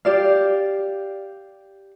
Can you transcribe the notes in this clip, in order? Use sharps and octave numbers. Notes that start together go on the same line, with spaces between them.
G4 D5 F5